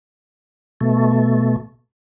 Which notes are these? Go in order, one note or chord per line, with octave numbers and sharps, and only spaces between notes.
B2 A3